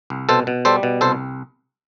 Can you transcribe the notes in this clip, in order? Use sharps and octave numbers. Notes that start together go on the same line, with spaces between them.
C2
B2 A4 C5
B2
G3 A4 C5
B2
C2 A4 C5